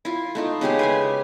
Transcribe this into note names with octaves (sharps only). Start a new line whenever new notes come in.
E4 F4
A3 D#4 F4
C#3 G#3 G4 F5
B4 E5 G#5